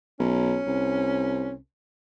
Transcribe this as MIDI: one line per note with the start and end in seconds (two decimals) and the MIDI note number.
0.20 0.60 35
0.20 1.55 61
0.66 1.55 36